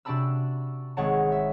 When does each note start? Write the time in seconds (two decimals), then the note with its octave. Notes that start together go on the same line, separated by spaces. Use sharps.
0.05 C3 D4 F#4 A5 B5 E6
0.97 G#1 G#3 C#5 F#5 A5
1.32 E5